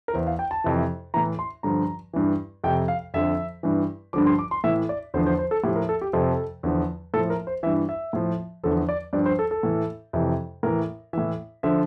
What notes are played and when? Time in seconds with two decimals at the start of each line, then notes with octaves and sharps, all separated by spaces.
0.08 A#4
0.13 E2 E3 C5
0.27 F5
0.39 G5
0.51 A5
0.64 F2 C3 E3
1.14 A2 E3 A#5
1.39 C6
1.63 G2 D3 F3 A#5
2.13 G2 E3
2.64 F2 C3 F3 G5
2.88 F5
3.14 F2 D3 F3 E5
3.63 G2 E3
4.13 G2 D3 F3 D6
4.26 C6
4.39 D6
4.51 C6
4.64 A2 E3 E5
4.89 D5
5.14 E2 D3 F3 C5
5.26 C5
5.39 C5
5.51 A4
5.63 A2 F3 G4
5.76 A#4
5.89 A4
6.01 G4
6.13 F2 C3 F3 A4
6.63 E2 D3 F3
7.14 A2 A4
7.17 F3
7.30 A#4
7.47 C5
7.63 E3 E5
7.67 G2
7.89 E5
8.13 A2 F3
8.64 E2 D3 F3 A4
8.89 D5
9.13 G2 F3 D5
9.26 C5
9.39 A4
9.51 A4
9.63 A2 E3
10.13 F2 C3 E3
10.63 A2 E3 A#4
11.13 A2 E3 E5
11.63 D3 F3 E5